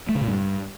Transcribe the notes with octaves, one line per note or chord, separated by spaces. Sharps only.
A3
C#3
A#2
G2